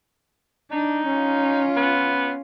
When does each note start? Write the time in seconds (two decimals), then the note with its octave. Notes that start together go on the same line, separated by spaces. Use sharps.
0.71 D4 D#4
1.09 C#4 F4
1.76 B3